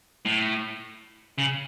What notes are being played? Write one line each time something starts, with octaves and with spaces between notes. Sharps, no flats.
A2
C#3